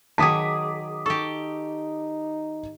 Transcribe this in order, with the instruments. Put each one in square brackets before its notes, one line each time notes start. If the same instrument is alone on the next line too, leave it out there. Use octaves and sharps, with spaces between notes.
[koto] D#3 F#3 G#4 [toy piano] G5 A5 [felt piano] D6 D#6 B6
[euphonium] D#4 [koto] G4 A4 [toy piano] C#6